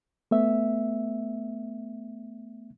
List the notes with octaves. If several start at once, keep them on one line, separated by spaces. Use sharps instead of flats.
A3 B3 E5